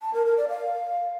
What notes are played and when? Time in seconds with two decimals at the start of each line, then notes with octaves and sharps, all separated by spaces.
0.02 A5
0.14 A#4
0.25 A#4
0.37 D5
0.49 F5